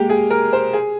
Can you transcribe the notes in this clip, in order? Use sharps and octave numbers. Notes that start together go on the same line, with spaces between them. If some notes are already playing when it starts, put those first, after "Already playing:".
Already playing: G#3 A#3 G4
G#4
A#4
C5
G#4